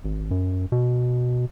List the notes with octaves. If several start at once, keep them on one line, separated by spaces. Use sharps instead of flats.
G#1
F#2
B2